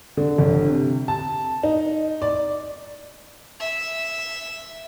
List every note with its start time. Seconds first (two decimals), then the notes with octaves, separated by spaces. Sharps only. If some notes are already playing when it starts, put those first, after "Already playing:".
0.17 D3
0.38 G1
0.67 C3
1.08 A5
1.63 D#4
2.22 D5
3.60 E5